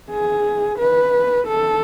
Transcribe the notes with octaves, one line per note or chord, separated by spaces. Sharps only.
G#4
B4
A4